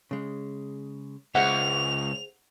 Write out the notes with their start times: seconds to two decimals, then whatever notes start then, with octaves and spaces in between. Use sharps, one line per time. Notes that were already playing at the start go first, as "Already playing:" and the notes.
0.11 C#3 G#3
1.35 C#2 G#4 C5 E5 F#5 F7